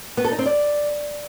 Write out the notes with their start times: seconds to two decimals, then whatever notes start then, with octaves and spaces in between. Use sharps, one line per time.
0.17 B3
0.24 A4
0.32 D#4
0.39 C4
0.46 D5